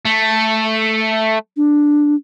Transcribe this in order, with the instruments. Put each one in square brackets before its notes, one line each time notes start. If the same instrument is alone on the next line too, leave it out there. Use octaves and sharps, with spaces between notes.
[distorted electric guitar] A3
[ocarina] D4